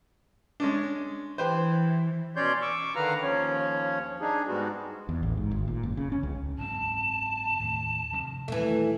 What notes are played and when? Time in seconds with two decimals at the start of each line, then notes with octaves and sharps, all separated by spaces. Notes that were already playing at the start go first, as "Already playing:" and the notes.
0.60 G#3 C#4 D4
1.38 E3 G4 B4 C5
2.36 B2 C#4 C#5 D5 C6 G6
2.61 C#6 D6 E6
2.96 D3 D#3 B4 F5 A#5 F6
3.22 D#2 F3 C#4 C#5
4.21 D4 D#4 G#4
4.47 G#2 G3 G#3 B3 D#4 F#4
5.09 E2
5.23 A1
5.37 G#2
5.51 G#1
5.68 A#2
5.83 F#1
5.97 C#3
6.12 C#4
6.23 C#2
6.58 F#1 G#2 C4 A5
7.60 D#2 A2
8.12 G2 C3 F3
8.48 D#1 D#2 E3 G3 A3